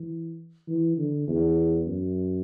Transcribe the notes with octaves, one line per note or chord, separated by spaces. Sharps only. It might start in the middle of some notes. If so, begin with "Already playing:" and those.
Already playing: E3
E3
D3
E2
F#2